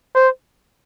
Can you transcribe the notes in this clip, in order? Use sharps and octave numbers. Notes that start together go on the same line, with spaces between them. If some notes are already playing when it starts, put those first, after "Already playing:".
C5